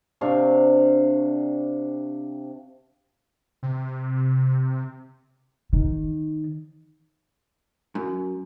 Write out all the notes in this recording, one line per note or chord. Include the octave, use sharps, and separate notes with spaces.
C3 D4 F5 C#6
C3
D#3
F#2